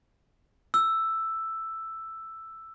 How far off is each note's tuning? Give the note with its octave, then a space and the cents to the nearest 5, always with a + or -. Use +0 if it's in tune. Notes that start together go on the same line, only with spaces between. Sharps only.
E6 +5